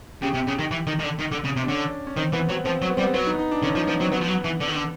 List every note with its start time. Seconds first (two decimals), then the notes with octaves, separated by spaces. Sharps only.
0.22 C#3 G4
0.34 C3
0.47 C#3
0.59 D#3
0.71 E3
0.87 D#3
0.99 D#3
1.04 D3
1.19 D#3
1.32 D3
1.44 C#3
1.56 C3
1.64 D4
1.68 D3 C#4
2.07 C#4
2.17 D#3 C4
2.33 E3 B3
2.49 F#3 C4
2.65 F3 C4
2.82 F#3
2.90 B3
2.97 G3 C4
3.04 B3
3.14 F#3 B3
3.27 D#4
3.39 D#4
3.51 D4
3.63 D3 C#4
3.75 F3 D#4
3.88 F3 B3
4.00 F#3 C4
4.12 F#3 B3
4.21 F3
4.28 F#3
4.44 E3
4.60 D3
4.68 D#3
4.75 D3